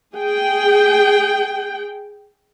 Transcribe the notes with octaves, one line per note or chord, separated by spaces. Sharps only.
G#4 G5